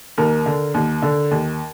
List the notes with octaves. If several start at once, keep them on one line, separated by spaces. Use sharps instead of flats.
D#2 A#4
D3
D#2
D3
D#2